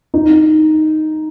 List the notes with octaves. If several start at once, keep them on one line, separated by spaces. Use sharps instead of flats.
D#4